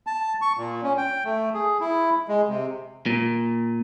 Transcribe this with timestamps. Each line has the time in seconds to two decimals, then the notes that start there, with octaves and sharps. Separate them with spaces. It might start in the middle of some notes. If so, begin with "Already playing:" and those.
0.07 A5
0.42 C#6
0.57 A#2
0.83 C#4
0.98 G5
1.25 A3
1.54 G#4
1.80 E4
2.28 G#3
2.49 C3
3.06 A#2